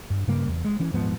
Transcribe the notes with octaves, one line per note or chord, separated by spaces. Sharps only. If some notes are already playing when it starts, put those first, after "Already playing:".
G2
G2 C#3 G3 A#3
E2
G#3
E3 C#4
D#1 G#2 F3 B3